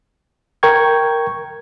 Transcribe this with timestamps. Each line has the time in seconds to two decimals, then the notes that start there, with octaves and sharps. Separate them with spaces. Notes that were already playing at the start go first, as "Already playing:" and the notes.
0.63 A#4 G5 C#6 G#6